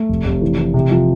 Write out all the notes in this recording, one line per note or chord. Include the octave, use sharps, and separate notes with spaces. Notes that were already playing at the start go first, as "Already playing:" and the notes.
Already playing: A3
F1
F1
E3
E3
C3
F3